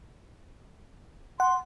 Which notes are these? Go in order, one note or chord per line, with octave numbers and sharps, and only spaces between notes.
F#5 C6